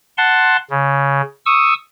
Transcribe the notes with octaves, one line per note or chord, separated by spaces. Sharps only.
F#5 A5 C6
C#3
C#6 D#6 E6